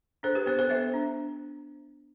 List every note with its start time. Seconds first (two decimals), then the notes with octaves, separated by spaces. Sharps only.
0.23 D4 A4 C5
0.35 G4 B4
0.46 B3 A4 C5
0.59 A4 C5
0.69 B3 C5 E5
0.93 D4